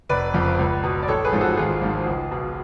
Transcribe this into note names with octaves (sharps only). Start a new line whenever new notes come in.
F1 B4 D5
F2 C#3 F3
C#2
B2
D5
A1 A4 C#5
G#4 B4
G#2 F3
F#4 A4
G#1 F4 G#4
G#2 F3
C#2
B2